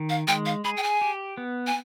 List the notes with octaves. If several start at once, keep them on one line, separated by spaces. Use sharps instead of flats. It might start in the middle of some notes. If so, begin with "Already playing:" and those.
Already playing: D#3
F5
G#3 G5
F5
G#4 B5
G5
G#5
G4
B3
G#5